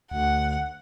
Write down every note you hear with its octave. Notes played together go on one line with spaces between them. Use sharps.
D2 F#5